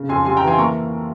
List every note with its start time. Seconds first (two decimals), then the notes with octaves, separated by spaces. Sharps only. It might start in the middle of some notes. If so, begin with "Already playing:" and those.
Already playing: C#3
0.09 F2 G#5 C6
0.25 G3 G#5 C6
0.37 G5 A#5
0.43 E3 G#5 C6
0.58 A#3 A#5 C#6